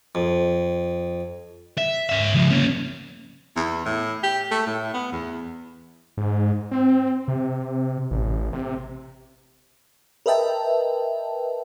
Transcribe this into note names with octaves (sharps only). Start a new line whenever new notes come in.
F2
E5
C#4 E5
C#3 F3
A#3 C#4
E2
A2
G4
A3
A2
B3
E2
G#2
C4
C3
A1
C3
A#4 B4 D#5 E5 G5 A5